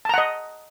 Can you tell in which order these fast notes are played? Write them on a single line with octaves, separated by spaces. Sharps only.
A5 A#5 F#5 D#5